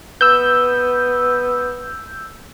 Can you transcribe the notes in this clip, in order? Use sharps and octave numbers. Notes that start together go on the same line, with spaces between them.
B3 E6 G6